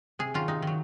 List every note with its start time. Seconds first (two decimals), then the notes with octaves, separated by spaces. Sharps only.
0.19 C3 G#4
0.34 D#3 F#3 F4
0.48 C3 D#4
0.62 D#3 F#3